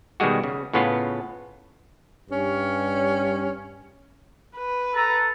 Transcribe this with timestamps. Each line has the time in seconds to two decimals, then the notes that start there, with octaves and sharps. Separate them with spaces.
0.20 B2 D#3 G3 G#3 F#4
0.44 C#3
0.73 A2 C#3 B3 C#4 F4
2.30 G2 C#4
4.57 B4
4.95 A4 A#5